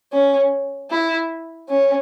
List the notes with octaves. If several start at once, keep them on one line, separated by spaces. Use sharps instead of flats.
C#4
E4
C#4